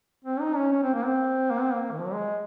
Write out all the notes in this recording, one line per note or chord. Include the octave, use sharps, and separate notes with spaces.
C4
D#4
C#4
C#4
C4
A#3
C4
A#3
C4
A#3
D#3
F3
F#3
G#3